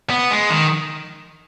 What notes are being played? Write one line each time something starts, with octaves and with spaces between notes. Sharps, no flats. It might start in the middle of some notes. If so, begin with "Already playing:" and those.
B3
G#3
D#3